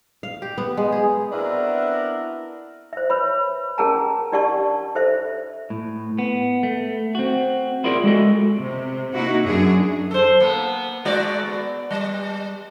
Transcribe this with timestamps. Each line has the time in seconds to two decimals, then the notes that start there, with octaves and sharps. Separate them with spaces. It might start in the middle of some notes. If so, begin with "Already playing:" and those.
0.23 F5
0.42 G4
0.58 B3
0.77 G#3
0.92 G#4
1.31 B3 C4 D4 E4 F#4 A#4
2.93 C5 E5
3.10 B4 C#5 B5
3.78 C#4 G#4 A#4 F#5 A5 A#5
4.32 D4 G4 D5 F#5 A5 C#6
4.95 A4 C5 E5
5.70 A2
6.19 B3
6.63 A3
7.15 C4 F#4
7.84 E4 F4 G#4 A#4 D5
8.04 G#3 F#4 A4 D#5
8.57 C3
9.12 A#3 D#4 E4 F#4
9.44 F#2 D4 G#4
10.11 A4 C5
10.40 A#3 B3
11.05 G#3 F#4 D5
11.46 B3
11.91 G3